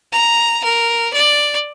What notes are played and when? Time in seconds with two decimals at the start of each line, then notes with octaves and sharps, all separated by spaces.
0.12 A#5
0.64 A#4
1.13 D5